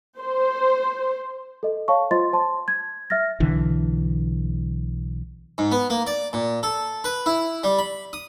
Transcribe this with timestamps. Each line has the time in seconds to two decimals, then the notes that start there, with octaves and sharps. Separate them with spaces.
0.21 C5
1.63 A4 D#5
1.88 C#5 F5 A5 C#6
2.11 F4 C5 D#5 C6 A6
2.33 C5 A5 C6
2.68 G#6
3.10 E5 F6 A6 A#6
3.40 B1 D3 E3
5.58 G#2
5.72 B3
5.90 A#3
6.07 D5
6.33 A#2
6.63 A4
7.04 B4
7.26 E4
7.63 G3
7.79 B5
8.13 D#6